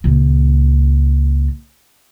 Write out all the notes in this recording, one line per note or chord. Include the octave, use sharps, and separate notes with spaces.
C#2 A#2